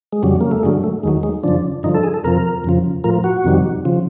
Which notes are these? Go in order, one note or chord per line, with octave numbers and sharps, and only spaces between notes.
G#3
F2 C#3 F#3 G3
A#3
A3
G2 D3 F#3 G#3
A3
D#2 D#3 F#3 G#3
G#3
F#2 C#3 F3 D4
G2 D3 F3 D#4
A4
G#4
A4
F2 C3 F3 A#4
F2 C#3 F3
A2 F3 A#4
F#4
F2 C3 D#3 G3
C#3 F3